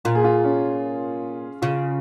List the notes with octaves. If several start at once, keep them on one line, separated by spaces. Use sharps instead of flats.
A#2 F4
G#4
F4
C#4
C#3 F4